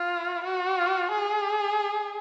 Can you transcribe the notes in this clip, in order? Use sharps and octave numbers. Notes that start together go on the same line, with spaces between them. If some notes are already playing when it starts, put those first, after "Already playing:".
Already playing: F4
F#4
G#4